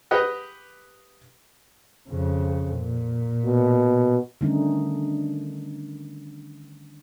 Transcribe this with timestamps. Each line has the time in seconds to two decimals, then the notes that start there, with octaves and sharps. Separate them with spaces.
0.11 G4 B4 D#5 F#5
2.09 F2 C#3
2.77 A#2
3.44 B2
4.41 D3 D#3 G3 A3 C#4 D#4